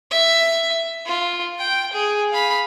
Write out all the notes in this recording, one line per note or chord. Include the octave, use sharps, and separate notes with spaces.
E5
F4
G5
G#4
F5 B5